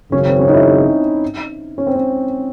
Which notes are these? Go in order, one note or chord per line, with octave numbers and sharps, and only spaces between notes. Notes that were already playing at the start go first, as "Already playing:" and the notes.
G#1 F#2 C#3 C#4
C4
C#4
D#4
E4
D#4
C#4
C4
C#4